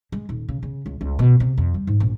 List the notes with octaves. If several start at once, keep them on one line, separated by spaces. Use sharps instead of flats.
G#3
D#1
C#3
C#3
C#2
C#2
B2
C3
F2
G3
G#2
A#1